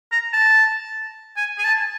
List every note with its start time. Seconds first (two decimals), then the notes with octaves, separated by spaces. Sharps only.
0.12 A#5
0.33 A5
1.36 G#5
1.58 G#5
1.64 A5